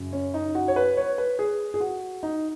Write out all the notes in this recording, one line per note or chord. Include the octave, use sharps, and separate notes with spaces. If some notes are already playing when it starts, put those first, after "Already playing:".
Already playing: F#2 C#3
C#4
D#4
F#4
C#5
B4
C#5
B4
G#4
G#4
F#4
D#4